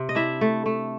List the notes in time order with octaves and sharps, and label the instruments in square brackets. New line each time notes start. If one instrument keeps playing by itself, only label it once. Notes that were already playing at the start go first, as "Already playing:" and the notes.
Already playing: [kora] C3
D#5
D4 E4 E5
A3
A3